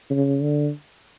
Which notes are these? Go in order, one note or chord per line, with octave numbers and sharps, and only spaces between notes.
C#3
D3